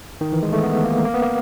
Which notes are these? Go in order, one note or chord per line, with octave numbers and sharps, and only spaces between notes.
D#3
E3
G#3
A3
B3
A#3
A#3
B3
A#3